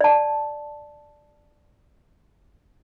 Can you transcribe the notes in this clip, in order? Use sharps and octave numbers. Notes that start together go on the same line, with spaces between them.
D5 A5